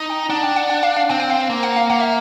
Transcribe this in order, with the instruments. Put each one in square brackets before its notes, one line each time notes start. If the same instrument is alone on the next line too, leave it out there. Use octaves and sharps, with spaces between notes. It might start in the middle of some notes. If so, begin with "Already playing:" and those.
Already playing: [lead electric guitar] D#4
[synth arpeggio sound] G5
[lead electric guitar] D4 [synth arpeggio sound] F#5
[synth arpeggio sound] G5
F#5
F#5
F5
F5
[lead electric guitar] C4 [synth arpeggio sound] G5
[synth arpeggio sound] G5
F5
F5
[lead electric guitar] A#3
[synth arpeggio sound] F#5
F5
[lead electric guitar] A#3 [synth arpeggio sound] F#5
[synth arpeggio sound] E5